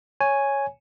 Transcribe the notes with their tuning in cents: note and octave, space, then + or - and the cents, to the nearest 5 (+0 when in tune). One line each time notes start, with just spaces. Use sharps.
C#5 +0 G#5 +0